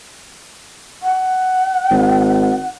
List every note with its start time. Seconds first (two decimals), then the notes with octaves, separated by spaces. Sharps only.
1.03 F#5
1.91 G#1